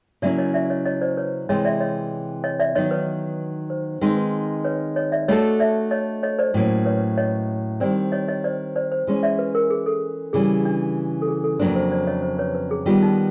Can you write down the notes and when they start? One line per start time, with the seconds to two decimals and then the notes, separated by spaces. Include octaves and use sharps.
0.22 C#3 F#3 A#3 C#4 E4 D5 E5
0.38 C#5 D#5
0.54 D5 E5
0.70 C#5 D#5
0.86 C#5 D#5
1.02 C5 D5
1.17 B4 C#5
1.49 C3 E3 G#3 C4 C#5 D#5
1.65 D5 E5
1.80 C#5 D#5
2.44 C#5 D#5
2.60 D5 E5
2.75 D#3 F#3 B3 D#4 C#5 D#5
2.91 B4 C#5
3.70 C5
4.01 D#3 G#3 C4 D#4 B4
4.17 B4
4.65 B4 C#5
4.96 C#5 D#5
5.12 D5 E5
5.28 A3 D4 F#4 A4 C#5 D#5
5.60 D5 E5
5.91 C#5 D#5
6.23 C#5 D#5
6.39 C5 D5
6.54 A2 F#3 A#3 C#4
6.86 B4 C#5
7.18 C#5 D#5
7.80 D#3 G3 C4 C5 D5
8.12 C#5 D#5
8.28 C#5 D#5
8.44 C5 D5
8.76 C5 D5
8.92 C5
9.07 E3 G#3 C#4
9.23 D5 E5
9.39 B4
9.55 A#4
9.70 G#4
9.86 A4
10.33 C#3 E3 G3 G#4
10.65 D4
11.22 A4
11.28 G#4
11.44 A4
11.59 F2 C#3 F#3 A#3 D4 B4
11.75 C5
11.91 C5 D5
12.07 C#5 D#5
12.23 C5
12.39 B4 C#5
12.55 B4
12.71 G#4
12.86 D#3 G3 B3 F4
13.02 D#4